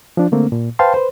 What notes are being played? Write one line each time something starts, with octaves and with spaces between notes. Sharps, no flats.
F3 D4
D3 A3 A#3 C4
A#2
B4 C5 F5 G5 A5 C6
B4 C5